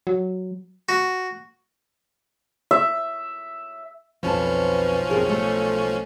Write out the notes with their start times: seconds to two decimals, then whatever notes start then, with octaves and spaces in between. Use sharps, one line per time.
0.07 F#3
0.89 F#4
2.71 E5
4.23 B1 F2 F3 C#4 B4 A5
5.10 F2 G#4 A#4
5.29 A3